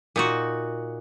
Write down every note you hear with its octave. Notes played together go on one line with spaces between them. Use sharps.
A#2 D#4 F#4